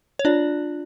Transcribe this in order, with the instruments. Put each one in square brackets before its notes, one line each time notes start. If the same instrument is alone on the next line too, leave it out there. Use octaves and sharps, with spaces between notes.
[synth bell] C#5
[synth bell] D4 D5 [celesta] F4